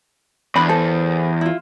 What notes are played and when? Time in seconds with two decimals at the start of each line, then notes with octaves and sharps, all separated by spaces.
0.56 E2 D4 C5 B5
0.69 A4 C5
1.41 E4 F4